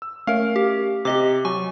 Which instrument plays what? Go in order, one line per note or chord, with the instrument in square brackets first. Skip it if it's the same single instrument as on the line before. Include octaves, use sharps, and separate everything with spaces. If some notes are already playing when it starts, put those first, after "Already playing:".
[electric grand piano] E6
[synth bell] A3 A#4 [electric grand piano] C#4 F5
[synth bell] G4
[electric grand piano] C3 [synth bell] G4 D#5 D6
[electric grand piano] F#3 [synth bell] G#5 C#6